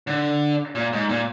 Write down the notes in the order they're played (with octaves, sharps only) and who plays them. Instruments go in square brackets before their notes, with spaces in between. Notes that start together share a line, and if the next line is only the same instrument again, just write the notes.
[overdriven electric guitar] D3
A#2
G#2
A#2